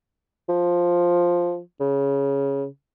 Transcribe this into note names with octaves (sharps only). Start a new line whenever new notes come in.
F3
C#3